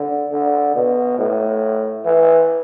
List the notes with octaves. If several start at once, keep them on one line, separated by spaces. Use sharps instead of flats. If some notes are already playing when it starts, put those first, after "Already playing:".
Already playing: D3
D3
B2
A2
E3